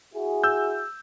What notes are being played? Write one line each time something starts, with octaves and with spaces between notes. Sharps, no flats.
E4 F#4 G#4
E6 G6